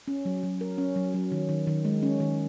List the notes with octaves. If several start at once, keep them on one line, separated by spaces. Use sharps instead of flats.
C#4
F#3
F#3
A#4
C#4
F#3
F#3
D#3
D#3
D#3
G#3
C#4
D#3